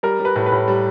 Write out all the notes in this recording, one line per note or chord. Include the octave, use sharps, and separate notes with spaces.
G3 A#4
G3
B4
A2
B4
A2
G3